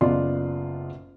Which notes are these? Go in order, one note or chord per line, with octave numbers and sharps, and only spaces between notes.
F#1 B3 F4 D5 D#5 C6